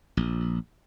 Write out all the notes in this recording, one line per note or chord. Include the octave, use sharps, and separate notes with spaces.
A#1